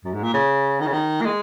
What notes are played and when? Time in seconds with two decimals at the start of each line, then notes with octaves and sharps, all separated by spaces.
0.04 F#2
0.14 G#2
0.23 A#2
0.34 C#3
0.80 D#3
0.87 C#3
0.93 D#3
1.21 A#3
1.25 G#3